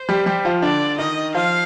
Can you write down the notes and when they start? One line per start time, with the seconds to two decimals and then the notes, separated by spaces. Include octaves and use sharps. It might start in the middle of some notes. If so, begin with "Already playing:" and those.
Already playing: C5
0.09 G3 G4
0.26 G3 G4
0.45 F3 F4
0.62 D3 D4 D5
0.98 D#3 D#4 D#5
1.34 F3 F4 F5